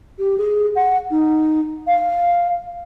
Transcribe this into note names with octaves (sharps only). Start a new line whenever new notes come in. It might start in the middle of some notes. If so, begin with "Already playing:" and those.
G4
G#4
F#5
D#4
F5